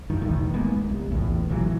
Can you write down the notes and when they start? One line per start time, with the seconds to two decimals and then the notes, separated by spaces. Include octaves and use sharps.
0.10 G2 D#3
0.21 B1 E2 A2 D#3
0.54 D1 G#3 A#3 B3
0.90 C2
1.11 A#1 E2 A2
1.49 G#1 A#2 E3 F#3